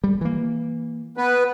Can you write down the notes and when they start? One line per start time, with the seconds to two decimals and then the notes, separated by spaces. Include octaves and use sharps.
0.04 G3
0.21 E3 A#3
1.17 B3 B4